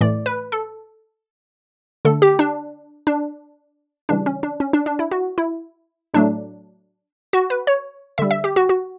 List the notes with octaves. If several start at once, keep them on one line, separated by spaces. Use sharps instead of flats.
A2 E3 A3 D5
B4
A4
D3 A3 A4
G4
D4
D4
C#3 E3 G3 D4
C#4
D4
C#4
D4
D4
E4
F#4
E4
A2 F#3 A3 D4
F#4
B4
C#5
D3 G3 E5
E5
G4
F#4
F#4